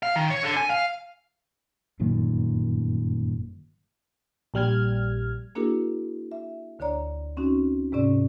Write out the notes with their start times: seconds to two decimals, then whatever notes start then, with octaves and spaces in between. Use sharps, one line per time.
0.03 F5
0.16 D#3
0.30 C#5
0.43 D3
0.57 G#5
0.70 F5
1.99 G1 F#2 A#2 D#3
4.54 A#1 G3 F6 G#6
5.55 A#3 D4 E4 F#4 G#4 A#4
6.32 E5
6.79 D2 D3 D4 C#5 D5 A#5
7.37 C4 C#4 D#4 F#4
7.92 G#2 C3 C#4 D5